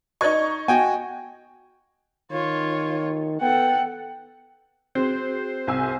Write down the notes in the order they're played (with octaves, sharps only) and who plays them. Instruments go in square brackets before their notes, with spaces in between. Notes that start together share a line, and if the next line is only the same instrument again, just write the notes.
[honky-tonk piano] D#4 C#6 [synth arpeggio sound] F#4 B4 D5 [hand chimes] D#5 G#6
[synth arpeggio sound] B3 [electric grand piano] F#4 G5 G#5
[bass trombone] D#3 [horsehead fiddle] F4 C#5
[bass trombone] B3 [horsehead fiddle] A4 F#5 [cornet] G5
[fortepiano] C4 [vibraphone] F#4 G#4 [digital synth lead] C5
[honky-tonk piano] C2 G#5 E6